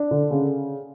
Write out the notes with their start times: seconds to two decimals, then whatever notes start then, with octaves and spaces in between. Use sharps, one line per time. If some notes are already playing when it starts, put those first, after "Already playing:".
Already playing: D4
0.11 D3
0.31 C#3